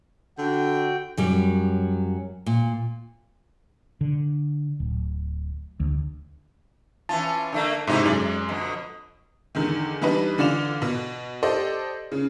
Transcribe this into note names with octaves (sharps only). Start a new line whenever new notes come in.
D3 F#4 G5
F#2 F#3 G3
A#2
D3
D1
D2
E3 C#4 F4 A5
D3 A3 A#3
G#2 C3 A3 C#4 D#4 E4
F#2 C3 G#3 D5
F2 B2 D3
E2 D3 D#3
E3 G3 D4 D#4 B4
D3 E3 F4 D5 E7 F7
B2
G4 A4 C5 D5 D#5
C#3